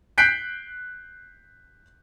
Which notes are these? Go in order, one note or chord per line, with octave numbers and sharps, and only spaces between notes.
F#6 G6 B6 C7 D7